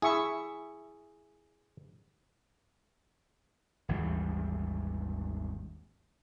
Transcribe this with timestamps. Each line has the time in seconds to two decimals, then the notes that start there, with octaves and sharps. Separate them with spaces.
0.02 E4 G#4 E5 C#6
3.89 G#1 D#2 E3 G3